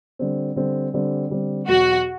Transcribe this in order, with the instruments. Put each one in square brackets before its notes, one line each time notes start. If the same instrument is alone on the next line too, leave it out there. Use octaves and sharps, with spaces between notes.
[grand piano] D3 G3 C4
D3 G3 C4
D3 G3 C4
D3 G3 C4
[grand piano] E2 B2 F#3 [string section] F#4